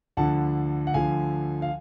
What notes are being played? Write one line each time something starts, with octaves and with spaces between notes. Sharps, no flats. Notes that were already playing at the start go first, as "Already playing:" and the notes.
D2 D3 F3 F#5 A5
F#5
D2 D3 F3 F5 G#5
F5